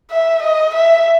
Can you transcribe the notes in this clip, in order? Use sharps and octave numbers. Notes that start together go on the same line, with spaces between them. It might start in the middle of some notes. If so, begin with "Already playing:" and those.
E5
D#5
E5